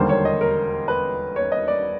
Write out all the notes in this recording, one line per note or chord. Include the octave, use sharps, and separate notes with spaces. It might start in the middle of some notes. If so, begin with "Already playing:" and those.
Already playing: E1 D#2 D3 G3 A#3 C5
C#5
D#5
A#4
B4
C#5
D#5
D5